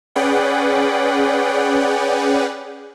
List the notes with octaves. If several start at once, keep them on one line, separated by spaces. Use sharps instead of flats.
C#4 G#4 B4 D5 F#5 G5